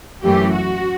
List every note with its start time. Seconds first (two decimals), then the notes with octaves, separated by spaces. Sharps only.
0.23 F#2 E3 A3 G4
0.52 F#4